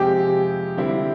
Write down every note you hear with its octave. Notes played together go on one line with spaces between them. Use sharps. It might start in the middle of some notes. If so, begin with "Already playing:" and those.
Already playing: F2 C3 F3 G#3 C4 G4
D3 G3 C4 E4